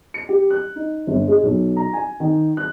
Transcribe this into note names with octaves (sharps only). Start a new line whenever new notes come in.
C#7
G4
F#6
D#4
G1
G#3
B1
A#5
G#5
D#3
F#6